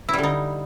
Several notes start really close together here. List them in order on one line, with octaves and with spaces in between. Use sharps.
E4 G3 D3 D#4